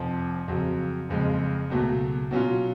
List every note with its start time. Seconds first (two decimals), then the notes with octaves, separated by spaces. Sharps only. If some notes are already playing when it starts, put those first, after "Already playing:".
Already playing: F1 F2 F3
0.48 F2 C#3 F#3
1.09 F#1 F2 C#3 G#3
1.70 C#2 B2 F#3 A3
2.31 B2 F#3 C#4 F4